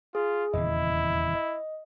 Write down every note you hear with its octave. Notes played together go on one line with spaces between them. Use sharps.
F4 G#4
D#1 E2 C#3 E4 D#5
D#5